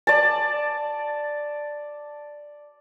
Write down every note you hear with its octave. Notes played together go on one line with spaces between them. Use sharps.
D5 A5